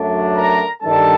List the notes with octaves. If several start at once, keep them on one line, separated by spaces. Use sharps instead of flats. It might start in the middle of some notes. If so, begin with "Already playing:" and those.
Already playing: F#2 F#3 A3 D4
A#4 A#5
G2 D#3 G3 D4 A4 A5